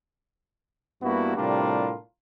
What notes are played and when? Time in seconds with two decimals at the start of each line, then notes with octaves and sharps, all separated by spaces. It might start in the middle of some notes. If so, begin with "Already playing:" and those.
1.03 G2 A#3 B3 E4 F#4
1.36 A2 C3 G3 D4 F4 A#4